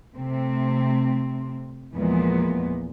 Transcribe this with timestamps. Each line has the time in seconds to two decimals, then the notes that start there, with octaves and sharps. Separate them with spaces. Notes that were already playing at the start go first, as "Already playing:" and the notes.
0.15 C3 A3 C4
1.95 E2 A#2 E3 F3 G#3 B3